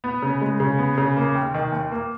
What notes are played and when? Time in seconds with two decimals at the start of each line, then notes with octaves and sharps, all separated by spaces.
0.04 B3
0.22 C#3
0.41 G#3
0.60 C#3
0.78 B3
0.98 C#3
1.17 A#3
1.35 D#2
1.54 D#3
1.72 D#2
1.92 A#3